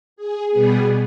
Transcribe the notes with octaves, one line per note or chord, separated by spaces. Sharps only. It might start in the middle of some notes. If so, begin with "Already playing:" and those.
G#4
B2 G3 B3 G#4